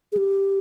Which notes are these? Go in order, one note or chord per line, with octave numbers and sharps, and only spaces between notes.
G#4
G4